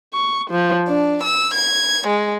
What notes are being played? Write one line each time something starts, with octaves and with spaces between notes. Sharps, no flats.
C#6
F3
D4
E6
G#6
G#3